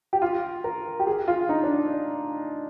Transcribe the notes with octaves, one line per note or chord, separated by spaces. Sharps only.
G4
F4
A#4
G4
G#4
F4
D#4
D4